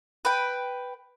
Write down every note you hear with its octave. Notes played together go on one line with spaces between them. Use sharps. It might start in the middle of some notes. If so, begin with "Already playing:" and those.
B4 G5